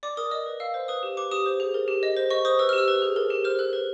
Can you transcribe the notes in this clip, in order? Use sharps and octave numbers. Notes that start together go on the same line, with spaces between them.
D5 D6
A#4 D#6
D#5 D#6
B4
F5 E6
C5
B4 D#6
G4
B4 D6
G4 D#6
C5
G#4
A#4
G4
D#5
C5
D#5 C#6
C5 D#6
B4 E6
F6
G4
E6
B4
G#4
A#4
G4
C5 F6
A4 F#6
B4